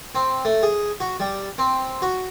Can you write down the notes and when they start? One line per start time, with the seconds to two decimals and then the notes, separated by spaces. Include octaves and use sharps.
0.15 C4
0.45 A3
0.63 G#4
1.00 F#4
1.20 G3
1.58 C4
2.02 F#4